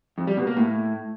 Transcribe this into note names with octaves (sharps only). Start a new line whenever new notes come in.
F2
G3
B2
A#3
A2